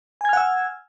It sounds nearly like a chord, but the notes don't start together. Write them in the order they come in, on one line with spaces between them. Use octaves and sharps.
G#5 G#6 F6 F#5 E6